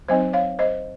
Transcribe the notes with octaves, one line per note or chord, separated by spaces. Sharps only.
F#3 C4 D#4 C5 D#5
C#5 F5
C5 D#5